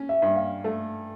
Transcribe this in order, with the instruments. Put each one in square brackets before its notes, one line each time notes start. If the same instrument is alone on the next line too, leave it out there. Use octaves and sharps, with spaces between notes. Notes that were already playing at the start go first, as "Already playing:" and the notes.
Already playing: [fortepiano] C#4
[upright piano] E5
[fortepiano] G2
[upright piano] F5
[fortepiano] A3